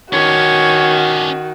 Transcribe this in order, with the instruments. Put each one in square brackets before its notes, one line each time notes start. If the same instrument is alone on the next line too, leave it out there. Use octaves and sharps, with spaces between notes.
[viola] D#3 [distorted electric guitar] C#4 D4 [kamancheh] F#4 [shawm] C#5